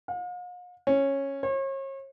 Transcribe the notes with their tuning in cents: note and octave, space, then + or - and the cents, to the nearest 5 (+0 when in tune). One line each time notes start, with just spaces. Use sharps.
F5 +45
C#4 -10
C#5 -40